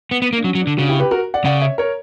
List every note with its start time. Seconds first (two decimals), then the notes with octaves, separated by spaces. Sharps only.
0.11 B3
0.22 B3
0.33 A#3
0.38 D4
0.44 F#3 C#4
0.55 F#3
0.62 D4
0.67 D3
0.77 C#3 D4 F#4
0.89 E4 G4
1.00 G4 B4
1.11 F#4 A#4
1.34 D5 F#5
1.45 C#3 D5 F#5
1.62 C#5 E5
1.78 A#4 C#5